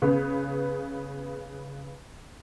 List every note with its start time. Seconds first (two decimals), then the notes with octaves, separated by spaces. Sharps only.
0.02 C#3 B3